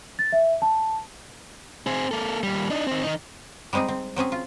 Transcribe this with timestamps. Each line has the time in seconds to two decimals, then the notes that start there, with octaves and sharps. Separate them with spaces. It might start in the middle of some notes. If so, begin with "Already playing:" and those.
0.19 A6
0.32 E5
0.62 A5
1.87 C4 G#4
2.11 A#3 A4
2.43 D#2 G3
2.70 D4 D#4
2.87 D#3 C4
3.03 D#3 D#4
3.73 G3 G#3 C4 D#4 G#4
3.88 C4
4.16 F#3 C4 C#4 G#4
4.32 F4